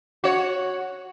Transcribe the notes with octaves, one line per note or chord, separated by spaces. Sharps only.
F#4 C#5